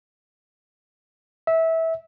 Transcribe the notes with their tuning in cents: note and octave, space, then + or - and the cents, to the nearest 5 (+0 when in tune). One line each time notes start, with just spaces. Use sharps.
E5 -20